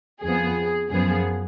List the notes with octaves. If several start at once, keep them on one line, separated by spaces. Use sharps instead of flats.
F2 F3 B3 G#4
F#2 F3 B3 G#4